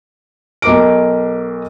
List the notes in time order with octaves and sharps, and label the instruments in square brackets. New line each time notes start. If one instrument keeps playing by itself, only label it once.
[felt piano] B1 A#4 D6 D7